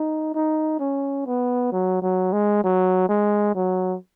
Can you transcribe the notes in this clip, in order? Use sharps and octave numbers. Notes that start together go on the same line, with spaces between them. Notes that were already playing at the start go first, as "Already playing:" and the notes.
Already playing: D#4
D#4
C#4
B3
F#3
F#3
G#3
F#3
G#3
F#3